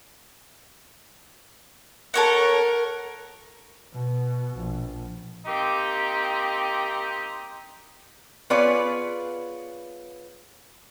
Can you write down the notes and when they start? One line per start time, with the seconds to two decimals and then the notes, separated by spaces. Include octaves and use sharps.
2.14 A4 A#4 C#5 F#5
3.93 B2
4.57 A#1
5.46 A#3 C4 D#4 G4
8.50 B3 F4 G#4 B4 C#5 D5